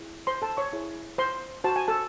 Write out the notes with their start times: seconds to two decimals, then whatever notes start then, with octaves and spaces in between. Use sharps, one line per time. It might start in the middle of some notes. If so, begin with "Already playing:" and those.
Already playing: E4 G#4
0.27 C5 C6
0.42 A4 A5
0.57 C#5 C#6
0.73 E4 G#4 C#5
1.18 C5 C6
1.64 F#4 C5 A5
1.76 G#5
1.88 A4 A5